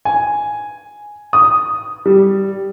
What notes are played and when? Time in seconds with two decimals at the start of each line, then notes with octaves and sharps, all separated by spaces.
0.05 G#5
1.33 D#6
2.06 G3